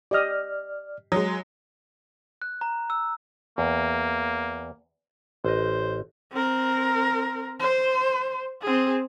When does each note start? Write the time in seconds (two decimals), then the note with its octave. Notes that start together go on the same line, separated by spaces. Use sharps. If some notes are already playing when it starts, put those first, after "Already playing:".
0.11 G4 D5 D#5 D#6 F6
1.12 F#3 G#3 D#6
2.42 F#6
2.61 A#5
2.90 E6
3.58 E2 A#3
5.45 A1 C5 D#5
6.32 C4 A#4
7.60 C5
8.62 C4 G#4